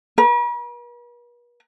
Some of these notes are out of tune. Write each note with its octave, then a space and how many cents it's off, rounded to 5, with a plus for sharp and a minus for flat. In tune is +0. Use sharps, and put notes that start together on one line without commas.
B4 -45